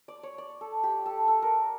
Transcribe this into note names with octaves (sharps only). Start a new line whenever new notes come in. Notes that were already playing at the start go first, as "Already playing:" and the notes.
D5
C#5
D5
A4
G4
A4
A4
A#4